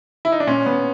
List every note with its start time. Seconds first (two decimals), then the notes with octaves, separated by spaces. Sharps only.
0.25 E4
0.32 D#4
0.40 D4
0.47 A#2 C#4
0.66 A#2 B3